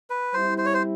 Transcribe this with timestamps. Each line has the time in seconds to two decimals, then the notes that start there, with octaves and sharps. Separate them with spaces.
0.10 B4
0.34 G3 C4 E4 C5
0.58 C5
0.66 C#5
0.74 C5